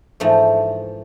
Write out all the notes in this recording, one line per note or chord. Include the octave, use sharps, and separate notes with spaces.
G#2 E3 F3 A3